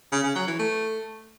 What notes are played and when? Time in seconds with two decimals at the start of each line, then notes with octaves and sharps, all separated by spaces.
0.12 C#3
0.24 C#3
0.36 F#3
0.48 E3
0.59 A3